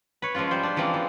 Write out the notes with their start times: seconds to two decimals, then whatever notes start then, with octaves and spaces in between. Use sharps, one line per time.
0.22 B4 C#5
0.35 F3 G#3 A#3 C#4 F4
0.51 G3 C5
0.63 D4
0.76 E3 F3 G#3 A#3 C4 D4
0.94 E3